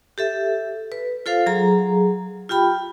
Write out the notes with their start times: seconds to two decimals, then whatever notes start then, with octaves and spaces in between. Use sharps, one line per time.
0.18 G4 A4 E5
0.92 B4
1.26 F4 A4 C5 F5
1.46 F#3 G#4 A#5
2.49 F4 G4 G5 B5